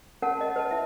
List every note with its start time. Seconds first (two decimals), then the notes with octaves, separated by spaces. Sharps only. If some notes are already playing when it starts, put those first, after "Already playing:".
0.22 C#4 A#4 F#5 A5
0.41 D#5
0.56 B4 A5
0.71 E4 E5